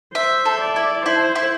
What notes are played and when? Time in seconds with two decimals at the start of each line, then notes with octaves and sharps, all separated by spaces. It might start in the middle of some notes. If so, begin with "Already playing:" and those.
0.15 C5 E5
0.45 A4
0.61 D5
0.76 E4
1.06 E4 C5
1.35 E4